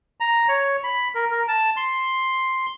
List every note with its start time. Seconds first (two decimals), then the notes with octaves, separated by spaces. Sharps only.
0.20 A#5
0.48 C#5
0.84 B5
1.15 A#4
1.31 A#4
1.48 A5
1.77 C6